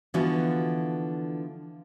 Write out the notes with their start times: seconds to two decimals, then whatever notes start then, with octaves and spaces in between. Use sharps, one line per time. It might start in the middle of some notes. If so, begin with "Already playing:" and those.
0.14 D3 E3 F3 B3 F#4